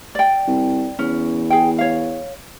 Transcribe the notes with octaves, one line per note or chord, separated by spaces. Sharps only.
D5 G5
C2
E2 C#4
G#4 G5
C#5 F5